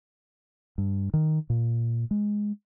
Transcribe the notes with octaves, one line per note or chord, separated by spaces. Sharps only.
G2
D#3
A#2
G#3